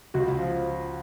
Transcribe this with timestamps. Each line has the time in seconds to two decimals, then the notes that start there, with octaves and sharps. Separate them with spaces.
0.14 C#2 F#4
0.39 F3